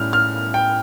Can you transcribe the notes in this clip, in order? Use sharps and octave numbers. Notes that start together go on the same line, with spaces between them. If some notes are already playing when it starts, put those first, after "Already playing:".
Already playing: A2 G3 C#4 F6
F6
G5